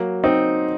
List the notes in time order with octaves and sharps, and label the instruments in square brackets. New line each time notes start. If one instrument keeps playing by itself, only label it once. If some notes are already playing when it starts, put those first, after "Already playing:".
Already playing: [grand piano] F#3 [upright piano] A#3
[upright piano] C4 [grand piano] D#4